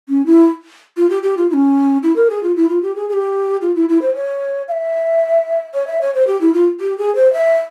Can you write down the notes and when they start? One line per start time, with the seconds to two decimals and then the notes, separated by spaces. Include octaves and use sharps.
0.09 C#4
0.26 E4
0.97 F4
1.10 G4
1.23 G4
1.37 F4
1.50 E4
1.54 C#4
2.03 E4
2.16 A#4
2.30 G#4
2.43 F4
2.56 E4
2.69 F4
2.83 G4
2.96 G#4
3.09 G#4
3.13 G4
3.62 F4
3.76 E4
3.89 E4
4.02 C5
4.15 C#5
4.68 F5
4.72 E5
5.74 C#5
5.87 E5
6.01 C#5
6.15 C5
6.27 G4
6.41 E4
6.54 F4
6.81 G4
6.98 G#4
7.15 C5
7.33 E5